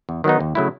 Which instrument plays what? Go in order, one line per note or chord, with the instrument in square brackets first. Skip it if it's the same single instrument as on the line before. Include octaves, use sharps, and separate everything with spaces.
[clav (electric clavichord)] E2
D#3 F#3 B3 D#4
D#2
C#3 F#3 A3 E4